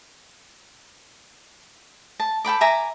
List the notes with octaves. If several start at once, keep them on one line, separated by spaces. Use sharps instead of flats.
A5
A4 G5 B5 D6
E5 G#5 A#5 D6